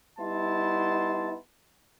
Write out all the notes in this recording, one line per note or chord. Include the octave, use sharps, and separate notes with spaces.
G3 B3 D#4 E4 A5 C6